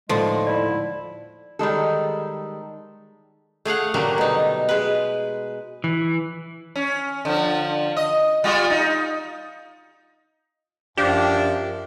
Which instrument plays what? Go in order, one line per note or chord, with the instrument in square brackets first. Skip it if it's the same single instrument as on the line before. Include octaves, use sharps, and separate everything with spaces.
[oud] D#2 A2 D3 [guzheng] F3 [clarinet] G#3 [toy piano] A4 C6
[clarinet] E4 [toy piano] D5
[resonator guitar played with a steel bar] D#3 G3 G#3 A4
[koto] A3 G#4 F5 F#5
A#2 D3 F#3 G3 A3 A#3
B2 D#4
G#3 B4
[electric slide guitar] E3
[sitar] C#4
D3 F3
D#5
G3 F4 F#4
D#4
[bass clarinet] F#2 [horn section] F3 D4 [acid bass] G4